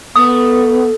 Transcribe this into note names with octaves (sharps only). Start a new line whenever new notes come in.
A3 B3 D#6